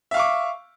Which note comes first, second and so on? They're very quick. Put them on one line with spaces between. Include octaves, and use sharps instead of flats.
E5 F5 C#6 D6